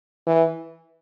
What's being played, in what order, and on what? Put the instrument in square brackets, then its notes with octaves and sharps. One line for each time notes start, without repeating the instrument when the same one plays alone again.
[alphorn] E3